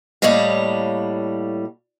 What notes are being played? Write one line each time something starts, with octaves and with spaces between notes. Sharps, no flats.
A2 G3 A#3 C#5 D#5 F5